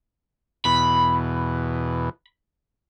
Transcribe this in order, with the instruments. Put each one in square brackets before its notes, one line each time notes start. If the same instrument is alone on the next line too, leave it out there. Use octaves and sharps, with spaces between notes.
[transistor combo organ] E2 B2 [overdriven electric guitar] B5